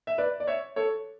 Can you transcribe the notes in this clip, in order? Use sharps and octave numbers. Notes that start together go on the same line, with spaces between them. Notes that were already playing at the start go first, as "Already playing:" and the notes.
E5
B4 D5
D5
C#5 E5
A4 C#5